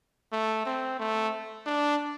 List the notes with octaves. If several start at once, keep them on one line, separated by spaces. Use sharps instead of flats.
A3
C4
A3
D4